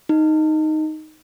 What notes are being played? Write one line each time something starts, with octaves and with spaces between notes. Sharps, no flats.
D#4